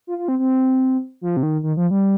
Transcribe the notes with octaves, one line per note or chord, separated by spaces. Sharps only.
F4
F4
C4
C4
F3
C3
D#3
D#3
F3
G3